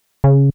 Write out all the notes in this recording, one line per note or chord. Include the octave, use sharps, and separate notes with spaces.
C#3